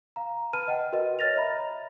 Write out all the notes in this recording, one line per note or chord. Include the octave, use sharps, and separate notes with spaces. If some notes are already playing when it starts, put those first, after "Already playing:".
F5 A#5
B4 A5 B5 F6 D#7
D#5 F#5 G5
F#4 A#4 B4 D#5
C#5 D#5 F6 A6 A#6 F7
C#5 D#5 E5 A#5 B5